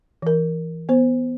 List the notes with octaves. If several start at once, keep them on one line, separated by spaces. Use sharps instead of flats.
E3 A#4
B3 C5